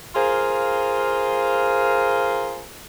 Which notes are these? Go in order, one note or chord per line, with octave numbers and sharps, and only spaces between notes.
F4 G#4 A#4 C5 F5